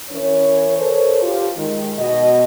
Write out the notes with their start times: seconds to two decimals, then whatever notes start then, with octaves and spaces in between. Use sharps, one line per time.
0.11 E3 C#4 A#4 C#5
0.77 A4 A#4 C5 C#5
1.22 F4 G4
1.57 D#3 G#3
1.98 B2 D#5